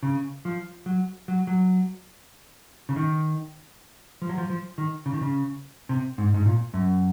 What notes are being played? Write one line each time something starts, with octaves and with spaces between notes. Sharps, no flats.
C#3
F3
F#3
F#3
F#3
C#3
D#3
F3
F#3
F3
F3
D#3
C#3
D#3
C#3
C3
G#2
G#2
A#2
F#2